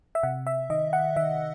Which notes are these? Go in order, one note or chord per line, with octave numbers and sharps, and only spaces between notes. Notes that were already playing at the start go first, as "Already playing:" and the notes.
E5
C3 F#5
E5
D#3 D#5
F#5
D#3 E5